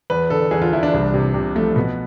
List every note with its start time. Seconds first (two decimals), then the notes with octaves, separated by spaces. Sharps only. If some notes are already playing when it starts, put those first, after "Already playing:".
0.10 E2 B4
0.30 D3 A4
0.51 E2 G#4
0.62 F4
0.73 E2 E4
0.83 D4
0.94 C2
1.14 C3
1.34 C3
1.55 F3 A3
1.76 B2 B3